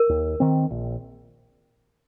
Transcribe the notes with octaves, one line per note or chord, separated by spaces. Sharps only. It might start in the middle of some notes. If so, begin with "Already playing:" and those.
Already playing: A#4
D#2
D#3 C4
A#1